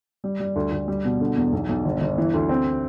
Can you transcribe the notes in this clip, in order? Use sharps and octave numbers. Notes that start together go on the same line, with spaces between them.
G3
G3
D2
D2
G3
B2
D3
E2
B1
B1
G1
G1
E3
D2
C4